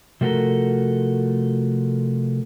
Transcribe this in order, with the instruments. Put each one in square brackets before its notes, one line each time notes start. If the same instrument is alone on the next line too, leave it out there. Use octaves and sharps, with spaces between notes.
[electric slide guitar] C3 F3 A3 F#4 A4 A#4